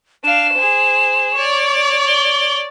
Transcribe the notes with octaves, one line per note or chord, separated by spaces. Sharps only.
D4 F5 E7
G#4 C5
C#5 D5
G7